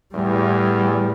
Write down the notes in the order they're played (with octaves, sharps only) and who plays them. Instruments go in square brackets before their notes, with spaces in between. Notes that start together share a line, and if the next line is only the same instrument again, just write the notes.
[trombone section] E2 [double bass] A2 G3